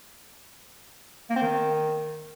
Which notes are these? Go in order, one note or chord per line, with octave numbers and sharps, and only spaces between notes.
A#3
C4
D#3